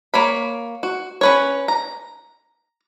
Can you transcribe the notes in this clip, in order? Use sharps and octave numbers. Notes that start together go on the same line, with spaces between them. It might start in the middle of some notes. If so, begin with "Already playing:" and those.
A#3 C#5 B5
F#4
C#4 B4 C#5
A#5